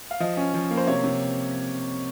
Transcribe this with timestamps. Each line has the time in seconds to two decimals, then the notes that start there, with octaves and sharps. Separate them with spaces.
0.11 F5
0.20 F3 D#5
0.37 C#4
0.54 F3
0.71 A#3
0.77 C5
0.87 C3 C#5
1.04 C3